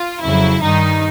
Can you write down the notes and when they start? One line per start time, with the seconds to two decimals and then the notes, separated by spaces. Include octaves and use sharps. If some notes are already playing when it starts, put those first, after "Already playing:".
Already playing: F4
0.21 F2 C#3 F#3 E4
0.61 G2 D#3 G3 D#4